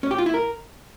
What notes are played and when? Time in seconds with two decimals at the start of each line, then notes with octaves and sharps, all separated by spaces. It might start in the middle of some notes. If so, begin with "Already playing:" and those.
0.03 C#4
0.11 G4
0.18 F4
0.26 E4
0.34 A#4